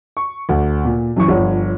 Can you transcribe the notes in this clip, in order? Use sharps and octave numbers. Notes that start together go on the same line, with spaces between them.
C#6
D2
A#2
F#2 E3 C#6
G1 F3 C#5